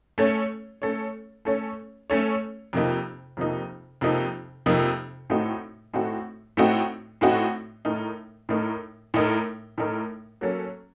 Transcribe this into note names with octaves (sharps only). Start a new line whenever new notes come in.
A3 C#4 A4 C#5
A3 C#4 A4 C#5
A3 C#4 A4 C#5
A3 C#4 A4 C#5
F2 C3 F3 A#3 D#4
F2 C3 F3 A#3 D#4
F2 C3 F3 A#3 D#4
F2 C3 F3 A#3 D#4
A2 A3 C4 D#4 F#4
A2 A3 C4 D#4 F#4
A2 A3 C4 D#4 F#4
A2 A3 C4 D#4 F#4
A2 A3 D#4 A#4
A2 A3 D#4 A#4
A2 A3 D#4 A#4
A2 A3 D#4 A#4
F#3 A#3 C#4 A4